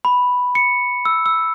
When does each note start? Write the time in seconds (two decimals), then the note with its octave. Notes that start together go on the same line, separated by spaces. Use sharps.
0.05 B5
0.55 C#7
1.05 E6
1.26 E6